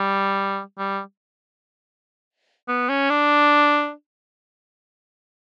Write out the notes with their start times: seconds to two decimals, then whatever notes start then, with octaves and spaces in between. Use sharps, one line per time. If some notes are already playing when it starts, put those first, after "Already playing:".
Already playing: G3
0.78 G3
2.68 B3
2.89 C#4
3.10 D4